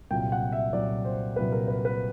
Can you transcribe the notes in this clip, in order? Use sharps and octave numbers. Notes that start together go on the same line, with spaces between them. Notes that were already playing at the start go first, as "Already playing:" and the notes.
C2 A#2 F#3 G5
F#5
E5
C2 A#2 F#3 D5
C5
C2 A#2 F#3 B4
A#4
B4
B4